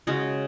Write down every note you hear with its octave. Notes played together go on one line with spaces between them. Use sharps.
C#3 G#3 C#4 F#4